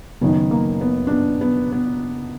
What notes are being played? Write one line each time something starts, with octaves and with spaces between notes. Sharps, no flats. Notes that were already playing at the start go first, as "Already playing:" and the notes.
F#1 F#2 D#3 B3
A#3
B3
D4
B3
B3
B3